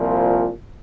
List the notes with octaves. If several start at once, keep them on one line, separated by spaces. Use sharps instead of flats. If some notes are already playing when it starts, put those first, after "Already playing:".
Already playing: C2 A#2 F3